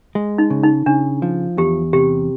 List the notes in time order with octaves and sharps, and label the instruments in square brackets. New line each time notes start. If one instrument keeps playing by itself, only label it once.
[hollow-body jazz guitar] G#3
[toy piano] D#4
[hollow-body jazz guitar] C#3
[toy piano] D#4
[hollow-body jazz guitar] C#3 [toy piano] D4
[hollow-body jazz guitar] F3
[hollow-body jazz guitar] E2 [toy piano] G4
[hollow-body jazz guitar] C3 [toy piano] G4